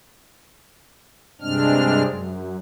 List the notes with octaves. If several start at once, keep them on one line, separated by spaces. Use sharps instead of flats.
G2 C3 G#3 C4 D4 F6
F#2